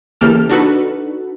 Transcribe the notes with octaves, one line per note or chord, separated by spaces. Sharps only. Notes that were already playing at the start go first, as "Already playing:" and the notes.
C#3 E3 A#3 G4 A4 F6
D4 D#4 F#4 A4 B4